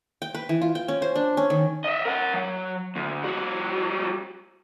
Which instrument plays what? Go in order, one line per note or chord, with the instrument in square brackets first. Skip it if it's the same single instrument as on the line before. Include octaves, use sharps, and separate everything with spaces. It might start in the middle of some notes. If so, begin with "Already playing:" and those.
[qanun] G5
B4
E3
F4
G5
C#4
C5
D4
C#4
D#3
[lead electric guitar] D#5 E5
A#4 F#5
F#3
D2
G3 F#4